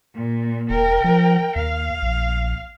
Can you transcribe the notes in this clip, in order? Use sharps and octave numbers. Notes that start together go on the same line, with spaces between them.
A#2
E1 A#4 G5
F3
D#2 F5
A#1